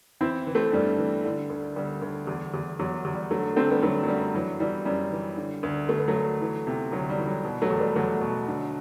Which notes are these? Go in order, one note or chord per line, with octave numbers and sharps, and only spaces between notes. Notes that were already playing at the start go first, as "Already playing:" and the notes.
E3 C4 E4
E3
A3 C4
G2 G3
E3
D3
D2
D2 G3
D2
E2
E2
E2 F#3
E2
G3
D3 F#3 A3
D3 A3 C4
G3 B3
D3 F#3 A3
F#3
F#2 G3
E3 F#3
E3 G3
F#2 G3
E3
D3
D2
D2 A3
B3
F#3 A3
D2
E3
C3
D2 F#3
G3
E3
F#3
B2
F#3 A3
E2
G3 B3
E2 F#3 A3
B2
D3